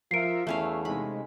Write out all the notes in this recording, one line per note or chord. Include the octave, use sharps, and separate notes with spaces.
F3 F4 A#4 E5 C7 D7
E2 A3 C#4 E4 F5
C3 G#3 D#4 B5